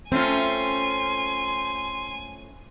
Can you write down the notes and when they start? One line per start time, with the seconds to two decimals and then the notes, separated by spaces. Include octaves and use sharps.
0.12 A3 C4 C#4 F4 G#5 C6